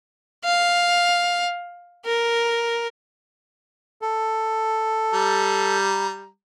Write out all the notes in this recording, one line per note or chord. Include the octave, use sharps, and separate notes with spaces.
F5
A#4
A4
G3 A#5